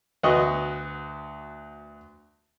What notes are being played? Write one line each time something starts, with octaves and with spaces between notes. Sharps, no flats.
D2 B3 F#4 D#5 C#6